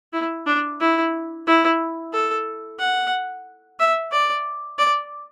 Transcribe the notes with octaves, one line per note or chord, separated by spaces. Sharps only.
E4
D4
E4
E4
A4
F#5
E5
D5
D5